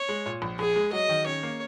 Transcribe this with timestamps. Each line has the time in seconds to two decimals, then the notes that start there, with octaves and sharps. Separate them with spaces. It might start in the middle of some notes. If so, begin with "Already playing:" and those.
Already playing: C#5
0.09 G#3
0.26 A#2
0.42 A#1
0.59 A#1 G#4
0.76 G#3
0.93 F#3 D#5
1.09 D#3
1.26 C#4 C#5
1.43 A#3